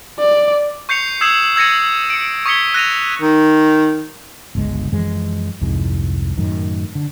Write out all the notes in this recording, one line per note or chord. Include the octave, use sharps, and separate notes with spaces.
D5
C#6 G6 C7 C#7 F7
D#6 E6 G#6 C7 E7 F#7
E6 G#6 A#6 C#7 D#7
C#7 D7
C#6 D#6 G#6 B6 C#7 G7
F#6 A#6 D#7 F7
D#3
G1 C#2 G#3
F#2 E3 F3 G#3
C2 F2 G#2 G#3
F#2 A2 D#3
D3